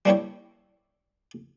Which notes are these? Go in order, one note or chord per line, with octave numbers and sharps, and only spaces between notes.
G3 A#3 D4 E4 G4 C#5